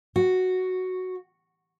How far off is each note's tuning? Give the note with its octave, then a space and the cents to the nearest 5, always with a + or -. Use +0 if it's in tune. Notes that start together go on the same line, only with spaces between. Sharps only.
F#4 +0